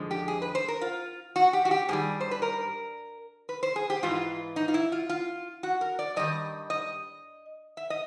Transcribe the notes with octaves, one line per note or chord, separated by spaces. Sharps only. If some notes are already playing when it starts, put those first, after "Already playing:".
Already playing: F2 D3 F3 G#3
G4
G#4
B4
C5
A#4
F4
F#4
G4
F#4
G4
G2 D#3 G3 G#4
C5
B4
A#4
B4
C5
G#4
G4
G#2 E3 F4
D#4
F4
E4
F4
F4
F#4
A#4
D5
G2 D#3 G3 D#5
D#5
E5
D#5